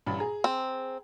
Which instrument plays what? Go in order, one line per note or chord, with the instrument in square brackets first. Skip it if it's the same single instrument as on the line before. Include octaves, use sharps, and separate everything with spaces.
[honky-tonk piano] A1 G2 B5
G#4 A#5
[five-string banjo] C4